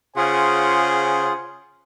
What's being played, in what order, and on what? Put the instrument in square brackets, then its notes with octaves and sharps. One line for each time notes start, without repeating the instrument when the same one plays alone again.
[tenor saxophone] C#3 [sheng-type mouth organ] F4 G#4 F#5 [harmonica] C5 G#5